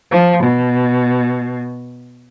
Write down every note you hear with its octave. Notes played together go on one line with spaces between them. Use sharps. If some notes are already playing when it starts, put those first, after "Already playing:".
F3
B2